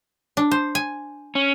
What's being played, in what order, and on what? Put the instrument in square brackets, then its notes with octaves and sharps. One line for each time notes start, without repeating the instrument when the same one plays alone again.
[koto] D4
C5
G#5
[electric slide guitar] C#4